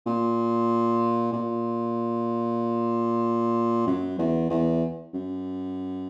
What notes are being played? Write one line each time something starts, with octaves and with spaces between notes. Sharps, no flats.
A#2
A#2
F#2
E2
E2
F#2